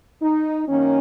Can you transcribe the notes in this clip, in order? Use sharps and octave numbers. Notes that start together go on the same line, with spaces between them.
D#4
F#2 D#3 A#3 C#4